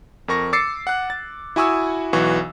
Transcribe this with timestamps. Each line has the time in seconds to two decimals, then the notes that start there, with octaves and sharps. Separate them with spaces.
0.28 F2 A#4 C#6 A#6
0.53 D6 E6 A6 C7 C#7
0.87 F#5 F#6
1.10 A6
1.56 E4 F#4 G#5 C#6 D#6 E6
2.13 B1 E3 F#4 C#6